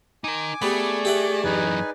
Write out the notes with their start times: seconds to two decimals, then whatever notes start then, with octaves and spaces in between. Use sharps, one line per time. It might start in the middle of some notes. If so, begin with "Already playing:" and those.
0.24 D#4 A#4 G#5 D6
0.62 G3 A3 B3 G#4 D5
1.05 G4 E5 F#5
1.44 F#2 E3 D#4 B4 G#5